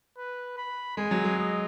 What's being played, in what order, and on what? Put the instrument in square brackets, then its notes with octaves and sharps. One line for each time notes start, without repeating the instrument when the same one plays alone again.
[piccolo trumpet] B4
B5
[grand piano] G#3 [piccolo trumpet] G#5
[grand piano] F#3
G#3
[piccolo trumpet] D#5